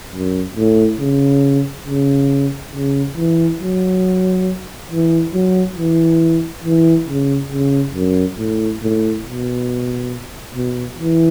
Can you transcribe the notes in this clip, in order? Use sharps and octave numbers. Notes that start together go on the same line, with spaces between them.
F#2
A2
C#3
C#3
C#3
E3
F#3
E3
F#3
E3
E3
C#3
C#3
F#2
A2
A2
B2
B2
E3